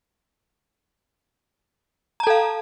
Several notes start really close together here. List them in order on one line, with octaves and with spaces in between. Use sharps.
A#5 A5 A4 F5